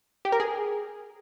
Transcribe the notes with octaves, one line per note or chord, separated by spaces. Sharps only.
G4
A#4
G#4